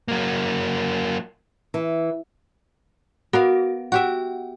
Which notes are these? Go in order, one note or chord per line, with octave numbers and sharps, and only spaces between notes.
F#3 A#3
E3
B3 F#4 A#4 F5
F#4 G4 E5 F#5